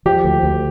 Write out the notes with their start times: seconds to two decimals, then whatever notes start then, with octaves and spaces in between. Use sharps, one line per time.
0.05 F3 G4
0.24 D2
0.43 D2